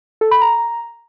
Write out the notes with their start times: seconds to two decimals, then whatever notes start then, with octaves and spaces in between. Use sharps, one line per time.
0.21 A4
0.31 B5
0.42 A#5